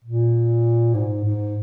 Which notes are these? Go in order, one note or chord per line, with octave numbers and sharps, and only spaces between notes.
A#2
G#2
G#2